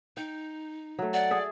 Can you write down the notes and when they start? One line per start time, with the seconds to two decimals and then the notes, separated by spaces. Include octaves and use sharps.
0.17 D#4 G5
0.99 F#3 A3
1.14 D5 F#5
1.31 G#4 E5